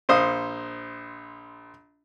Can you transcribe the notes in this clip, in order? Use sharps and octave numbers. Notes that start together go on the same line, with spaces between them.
A#1 C5 F5 D#6